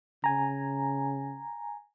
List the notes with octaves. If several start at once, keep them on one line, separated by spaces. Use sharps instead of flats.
C#3 G#5 A#5